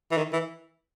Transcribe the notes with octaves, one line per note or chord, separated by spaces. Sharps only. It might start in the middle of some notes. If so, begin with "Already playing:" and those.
E3
D#3
E3